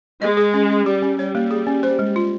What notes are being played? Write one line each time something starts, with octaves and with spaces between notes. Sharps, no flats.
G#3 D#5
G#4
C#4
C#4
G3 G4
C#4
G3 C#5
A#3
G#4
C#4
C5
G#3
F4